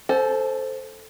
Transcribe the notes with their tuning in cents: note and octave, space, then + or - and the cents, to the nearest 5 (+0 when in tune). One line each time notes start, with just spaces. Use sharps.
A4 +0 C5 +0 G#5 +45